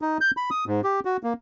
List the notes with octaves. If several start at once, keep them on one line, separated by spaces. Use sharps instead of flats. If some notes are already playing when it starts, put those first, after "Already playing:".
D#4
G6
B5
D#6
G#2
G4
F#4
A#3